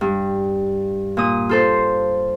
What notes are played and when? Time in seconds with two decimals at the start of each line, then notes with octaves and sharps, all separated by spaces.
0.01 G2
1.17 A#2 D#6
1.49 F4 A4 C5